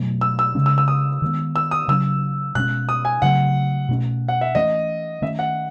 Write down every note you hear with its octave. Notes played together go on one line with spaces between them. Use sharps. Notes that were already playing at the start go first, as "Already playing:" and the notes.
Already playing: B2 F#3 A3
E6
E6
C#3 G#3 C#4
E6
E6
D#6
D#3 G#3 B3
E6
D#6
C#3 F#3 C#4 E6
B2 G#3 C#4 F#6
D#6
G#5
C#3 F#3 A3 F#5
B2 A3 C#4
F#5
E5
E3 A3 C#4 D#5
D#3 A3 C#4 E5
F#5